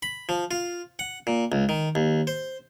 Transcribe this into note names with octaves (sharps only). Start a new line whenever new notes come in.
B5
F3
F4
F#5
A#2
C#2
D#3
D#2
C5